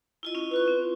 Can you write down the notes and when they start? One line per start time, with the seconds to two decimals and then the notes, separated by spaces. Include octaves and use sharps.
0.23 E4 F4 D#5
0.35 C#4 E4 F4
0.51 E4 F4 B4 C#6
0.66 C4 F4